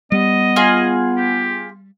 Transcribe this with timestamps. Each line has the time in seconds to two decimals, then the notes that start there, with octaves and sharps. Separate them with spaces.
0.12 G3 B3 D#5
0.56 F4 G#4
1.17 G4